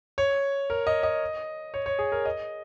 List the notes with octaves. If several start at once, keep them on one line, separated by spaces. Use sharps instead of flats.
C#5
A#4
D#5
D#5
C#5
C#5
G#4
A#4
D#5